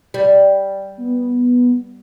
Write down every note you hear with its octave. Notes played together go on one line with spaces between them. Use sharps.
G3
B3